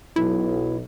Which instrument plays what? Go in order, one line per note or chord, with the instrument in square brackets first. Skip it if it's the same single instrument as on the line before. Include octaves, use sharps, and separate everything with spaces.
[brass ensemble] B1 [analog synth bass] E4